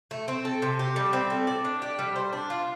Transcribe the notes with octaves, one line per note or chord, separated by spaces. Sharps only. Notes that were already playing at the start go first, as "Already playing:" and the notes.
A3
C4
A4
C3
G4
G3
C4
A3
D5
D4
G4
G3
C5
D4
F4